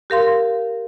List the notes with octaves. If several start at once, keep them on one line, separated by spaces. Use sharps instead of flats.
G4 A#4 F5 C6